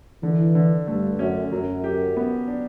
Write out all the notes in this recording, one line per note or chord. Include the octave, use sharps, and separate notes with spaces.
D3 E3
D3
G2 A3
F#2 C#4
F#2 F#3
G4
B3
D4